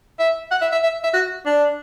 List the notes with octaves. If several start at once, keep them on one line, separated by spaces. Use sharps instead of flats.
E5
F#5
E5
E5
E5
E5
F#4
D4